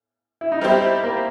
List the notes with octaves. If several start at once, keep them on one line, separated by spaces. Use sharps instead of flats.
E4
D#4
G3 C4 E4 G4 C5
A#3